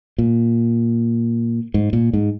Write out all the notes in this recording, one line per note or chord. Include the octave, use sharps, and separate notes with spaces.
A#2
G#2
A#2
G#2